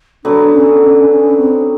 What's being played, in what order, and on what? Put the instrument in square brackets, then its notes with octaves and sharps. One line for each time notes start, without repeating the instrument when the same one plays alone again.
[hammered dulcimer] D3 F#3 B3 [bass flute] D4
[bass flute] C#4
C#4
C#4
C4